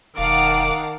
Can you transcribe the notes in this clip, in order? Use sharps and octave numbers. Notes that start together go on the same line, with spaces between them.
E1 D#3 F5 F#5 A5 D6